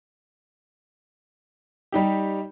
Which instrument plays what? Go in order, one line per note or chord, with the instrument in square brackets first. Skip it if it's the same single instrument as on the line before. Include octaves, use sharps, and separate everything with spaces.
[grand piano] G3 D#4 G4